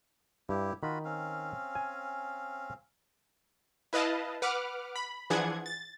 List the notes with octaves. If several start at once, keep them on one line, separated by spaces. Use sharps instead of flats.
G2 E4 G4
D#3 F4 F#4 B5
C4 C#4 F5
G#5
E4 B4 D#5 F5 A5
B4 F#5 D6 F6
B5
E3 F3 D4 G#4 F#5 G#6
A6